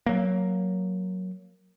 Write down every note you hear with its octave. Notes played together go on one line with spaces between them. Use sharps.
F#3 A#3